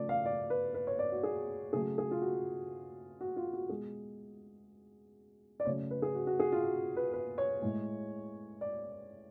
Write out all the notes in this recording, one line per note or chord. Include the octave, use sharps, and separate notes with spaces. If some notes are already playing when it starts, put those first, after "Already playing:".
Already playing: C#3 F3 A3 D5
F5
D5
B4
B4
C#5
D5
F#4
G#4
C#3 F#3 A3 G#4
G#4
F4
F#4
F#4
F4
F#4
B2 G#3 G#4
D5
C#3 F#3 A3 C#5
B4
G#4
F#4
F#4
G#4
F4
F#4
B4
B4
C#5
A2 G#3
D5